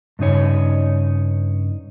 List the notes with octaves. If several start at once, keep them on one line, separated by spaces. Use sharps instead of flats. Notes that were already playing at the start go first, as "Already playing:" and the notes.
G2 C#3 D#4 C#5